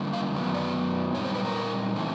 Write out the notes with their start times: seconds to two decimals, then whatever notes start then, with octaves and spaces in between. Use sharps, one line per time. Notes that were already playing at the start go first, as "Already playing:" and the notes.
Already playing: D3 G3 A#3 C#4 E4
0.13 F5
0.34 F#2 D#3 F#3 B3
0.54 D5
1.15 A#2 G3 C4 D#4 C#5
1.25 C5
1.35 B4
1.45 A#4
1.96 E3 A3 C4